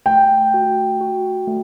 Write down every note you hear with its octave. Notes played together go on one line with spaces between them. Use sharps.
A3 G5
F#4
F#4
A3